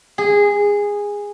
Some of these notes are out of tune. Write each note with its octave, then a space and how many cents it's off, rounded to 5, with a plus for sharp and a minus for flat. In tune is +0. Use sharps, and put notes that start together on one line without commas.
G#4 -15